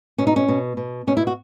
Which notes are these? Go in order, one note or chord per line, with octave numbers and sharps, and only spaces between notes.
B2 C#4
D#4
C#4
B2
B2
B2 C#4
E4
F#4